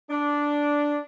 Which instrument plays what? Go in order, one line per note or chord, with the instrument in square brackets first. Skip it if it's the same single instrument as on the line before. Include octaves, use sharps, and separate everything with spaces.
[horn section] D4